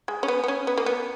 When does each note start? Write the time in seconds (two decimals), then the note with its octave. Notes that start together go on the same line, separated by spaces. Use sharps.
0.08 G#3
0.23 C#4
0.28 B3
0.44 B3
0.48 C#4
0.67 B3
0.77 A#3
0.86 B3